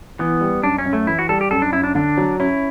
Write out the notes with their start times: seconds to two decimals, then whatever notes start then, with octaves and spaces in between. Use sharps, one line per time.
0.19 E3 B3
0.41 G3
0.63 F#2 D4
0.78 C#4
0.86 F#2
0.93 A3
1.07 E3 E4
1.19 F#4
1.29 G3 A4
1.41 G4
1.51 F#2 A4
1.62 D4
1.73 F#2 E4
1.84 D4
1.95 D3 D4
2.17 F#3
2.40 C#4 E4